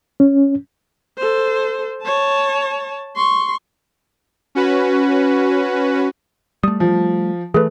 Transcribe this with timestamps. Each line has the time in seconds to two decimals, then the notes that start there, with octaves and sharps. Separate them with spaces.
0.20 C#4
1.17 A4 C5
2.03 C#5 A5
3.16 C6 C#6
4.55 C#4 F#4 B4
6.63 G3 A3 D#6
6.80 F3
7.54 E3 A3 G#4 A4 B4